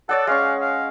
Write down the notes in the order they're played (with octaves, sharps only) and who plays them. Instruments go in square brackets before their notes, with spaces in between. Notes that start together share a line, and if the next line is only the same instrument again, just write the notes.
[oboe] A4 [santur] C#5 D5 F#5
[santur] G#3 C#4 C#6 [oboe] F5
[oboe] F5